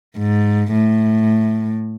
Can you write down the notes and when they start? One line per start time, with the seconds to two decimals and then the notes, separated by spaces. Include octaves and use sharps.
0.18 G#2
0.72 A2